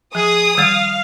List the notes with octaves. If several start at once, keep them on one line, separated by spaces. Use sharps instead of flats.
F3 G#4 D#6
D#3 G3 F5 A6